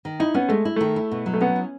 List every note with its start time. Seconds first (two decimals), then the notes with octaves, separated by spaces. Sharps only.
0.05 D#3
0.20 D#4 E4
0.34 B3 C#4
0.49 G#3 A3
0.65 E4
0.76 D#3 A3
0.96 E4
1.11 B2
1.26 F#3
1.33 A3
1.41 B3 C#4
1.56 E4